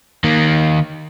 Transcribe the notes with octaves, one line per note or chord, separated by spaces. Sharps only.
D#3 A#3